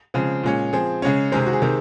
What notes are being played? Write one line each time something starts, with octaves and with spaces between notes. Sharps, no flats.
C#3 F3 G#3 C4
A#2 G#3 C#4
F3 C4 G#4
C#3 G#3 C#4
C3 D#3 G#3 C4 A#4
G#4
F#4
G#4
C3 D#3 G#3 C4